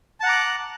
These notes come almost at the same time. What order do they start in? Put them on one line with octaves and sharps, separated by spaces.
A5 F#5 A#5 D6 F#6